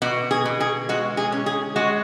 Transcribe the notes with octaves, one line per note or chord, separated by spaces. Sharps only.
B2 F#4
G#4
B2
G#4
G#3 F#4
G#4
C#4
G#4
G#3 F#4